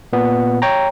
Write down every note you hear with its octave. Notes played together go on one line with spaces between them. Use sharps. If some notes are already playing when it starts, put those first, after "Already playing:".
A#2 B3
C#5 G5 A#5